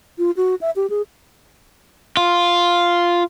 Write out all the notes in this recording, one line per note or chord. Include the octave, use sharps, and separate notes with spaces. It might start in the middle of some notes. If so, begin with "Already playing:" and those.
F4
F#4
E5
G4
G#4
F4